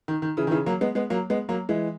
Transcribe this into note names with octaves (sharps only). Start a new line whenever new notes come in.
D#3
D#3
C#3 E3
D#3
C#3 E3
F#3 A#3
G#3 B3
G#3 B3
F#3 A#3
G#3 B3
F#3 A#3
E3 G#3